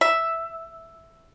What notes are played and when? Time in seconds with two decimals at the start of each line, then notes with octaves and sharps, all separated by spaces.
0.01 E5